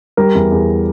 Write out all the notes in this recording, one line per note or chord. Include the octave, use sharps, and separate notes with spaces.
G3 A#4
E2
E2